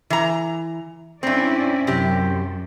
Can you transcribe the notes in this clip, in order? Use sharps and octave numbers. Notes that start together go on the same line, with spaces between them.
E3 A#5
G2 C4 C#4 E4 D5
F#2 C3 G4